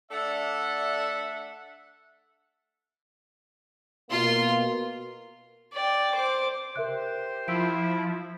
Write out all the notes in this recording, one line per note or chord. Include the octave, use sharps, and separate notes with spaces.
A3 D4 A4 D5 E5 F#5
B2 A#3 F4 C6
D5 G5
C5 D6
G4 A#4 C5 E5 F#6
F3 E4 E6 B6 D7